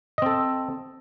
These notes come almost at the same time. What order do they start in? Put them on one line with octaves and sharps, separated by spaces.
D#5 C4 A4